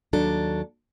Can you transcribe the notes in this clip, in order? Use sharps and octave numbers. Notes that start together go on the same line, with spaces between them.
D#2 F#3 D4 A4